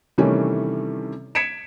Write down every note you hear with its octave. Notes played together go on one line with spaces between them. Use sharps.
C3 D#3 E3 G3 A3 C#4
G#6 B6 C#7 D7 E7